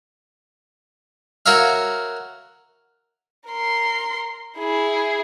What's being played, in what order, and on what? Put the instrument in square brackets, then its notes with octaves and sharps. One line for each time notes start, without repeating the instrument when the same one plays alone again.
[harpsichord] F#4 A#4 C#5 E5 F5
[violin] A#4 C6
E4 G#4